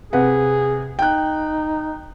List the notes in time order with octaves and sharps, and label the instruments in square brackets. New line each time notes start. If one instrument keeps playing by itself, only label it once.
[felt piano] C3 B4 F#5 [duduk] G#4
[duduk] D#4 [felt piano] G5 F#6